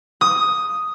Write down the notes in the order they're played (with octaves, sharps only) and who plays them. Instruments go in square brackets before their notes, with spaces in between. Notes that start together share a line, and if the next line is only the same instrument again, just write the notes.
[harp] D#6